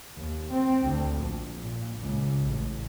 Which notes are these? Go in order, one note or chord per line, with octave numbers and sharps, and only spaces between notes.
D#2
C4
D2
A#1
A#2
C#2
A1